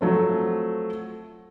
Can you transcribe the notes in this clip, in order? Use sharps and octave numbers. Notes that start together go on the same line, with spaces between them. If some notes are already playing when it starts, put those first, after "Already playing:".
F3 F#3 A3 C4